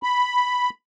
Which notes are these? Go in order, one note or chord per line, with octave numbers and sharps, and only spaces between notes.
B5